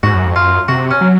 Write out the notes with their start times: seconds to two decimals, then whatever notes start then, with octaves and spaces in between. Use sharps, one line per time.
0.03 G#2 F#4
0.14 F#2
0.25 F2
0.36 F#2 F4
0.68 C3 F#4
0.91 C#4
1.01 F#3